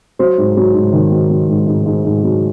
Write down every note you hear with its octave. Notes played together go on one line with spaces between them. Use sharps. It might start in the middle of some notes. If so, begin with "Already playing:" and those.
F#3 C5
G#2
F#3
G#2
D#3
F#3
F#3
G#2
G#2
G#2
G#2
F#3